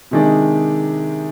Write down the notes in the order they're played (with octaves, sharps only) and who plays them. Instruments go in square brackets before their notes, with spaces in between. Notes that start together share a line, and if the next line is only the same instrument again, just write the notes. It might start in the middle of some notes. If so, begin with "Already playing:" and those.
[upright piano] C3 D#3 G#3 D4